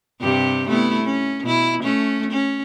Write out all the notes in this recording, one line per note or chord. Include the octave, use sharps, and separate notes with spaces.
G2 C3 G4
A3 B3 E4
C#4
B2 E4
A3 C#4
C#4